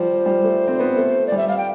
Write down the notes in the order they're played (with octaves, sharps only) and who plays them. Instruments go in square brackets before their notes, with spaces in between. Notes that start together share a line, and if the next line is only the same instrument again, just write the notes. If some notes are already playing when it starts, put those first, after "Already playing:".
Already playing: [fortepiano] F3 G3 [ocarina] C5
[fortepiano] G3
A3
C4
B3
A3
[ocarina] D5
[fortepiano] G3
[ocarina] E5
F5
G5